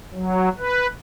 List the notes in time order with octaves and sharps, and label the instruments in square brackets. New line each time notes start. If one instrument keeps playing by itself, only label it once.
[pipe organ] F#3
B4